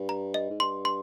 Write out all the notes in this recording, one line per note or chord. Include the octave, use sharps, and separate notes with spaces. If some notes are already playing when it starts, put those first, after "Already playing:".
Already playing: G2
A#5
D#5
G#2
G2 C6
C6